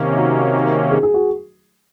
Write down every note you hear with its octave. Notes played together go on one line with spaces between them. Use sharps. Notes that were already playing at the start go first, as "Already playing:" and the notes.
Already playing: C3 D#3 A#3 C#4
F#4
G#4
G#4
F#4